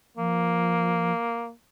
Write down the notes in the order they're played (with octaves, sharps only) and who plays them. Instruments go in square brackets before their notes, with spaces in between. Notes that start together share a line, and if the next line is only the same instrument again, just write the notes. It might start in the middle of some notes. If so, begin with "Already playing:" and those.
[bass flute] F3 [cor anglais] A#3